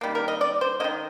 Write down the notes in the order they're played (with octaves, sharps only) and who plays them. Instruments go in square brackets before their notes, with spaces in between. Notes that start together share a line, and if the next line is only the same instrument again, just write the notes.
[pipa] D#3 G3 A#3
A#4
D#5
D5
C5
A#3 D#5
D#3